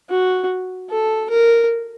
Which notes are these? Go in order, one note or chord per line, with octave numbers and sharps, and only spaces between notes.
F#4
A4
A#4